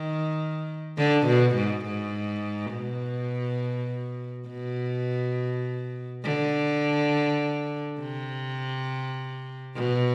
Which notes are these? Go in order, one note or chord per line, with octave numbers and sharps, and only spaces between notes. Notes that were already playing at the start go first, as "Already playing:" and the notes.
Already playing: D#3
D3
B2
G#2
G#2
B2
B2
D3
C3
B2